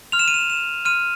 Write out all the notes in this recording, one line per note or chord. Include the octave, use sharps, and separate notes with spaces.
C6 F6 F7
E7
D#7
E7
E7
C6 F6 D#7